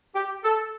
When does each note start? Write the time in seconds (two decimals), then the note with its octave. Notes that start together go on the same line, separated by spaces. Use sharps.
0.15 G4
0.44 A4